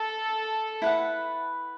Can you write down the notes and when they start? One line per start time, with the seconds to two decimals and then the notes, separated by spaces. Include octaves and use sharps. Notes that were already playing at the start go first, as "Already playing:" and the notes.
Already playing: A4
0.82 E4 B4 F#5